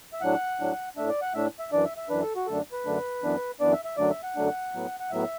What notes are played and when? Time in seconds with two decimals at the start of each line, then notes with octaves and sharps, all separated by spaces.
0.13 E5
0.21 A2 F#3 D4 F#5
0.59 A2 F#3 D4
0.96 A2 A3 D4 E5
1.09 D5
1.22 F#5
1.34 A2 A3 D4 E5
1.59 E5
1.72 F#2 E3 D4 D5
1.85 E5
1.97 E5
2.09 F#2 E3 D4 B4
2.22 A4
2.36 F#4
2.47 F#2 D3 A3 D4 A4
2.72 B4
2.85 F#2 D3 A3 D4
3.23 F#2 E3 B3 D4
3.60 F#2 E3 B3 D4 D5
3.73 E5
3.85 E5
3.97 F#2 D3 F#3 A3 D4 D5
4.10 E5
4.23 F#5
4.36 F#2 D3 F#3 A3 D4
4.73 A2 F#3 B3
5.00 F#5
5.11 A2 F#3 B3 E5